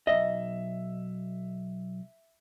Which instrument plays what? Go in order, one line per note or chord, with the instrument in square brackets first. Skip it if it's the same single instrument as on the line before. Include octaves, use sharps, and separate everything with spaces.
[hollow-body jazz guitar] B1 F2 D#5 [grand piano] E5